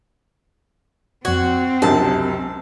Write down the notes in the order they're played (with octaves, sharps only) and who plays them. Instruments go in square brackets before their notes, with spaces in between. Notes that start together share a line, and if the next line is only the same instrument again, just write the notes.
[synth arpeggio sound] F2 G#6 [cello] C4 [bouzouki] F#4
[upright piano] C#2 F#2 C3 [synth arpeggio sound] D4 G4 A#4 [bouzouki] A5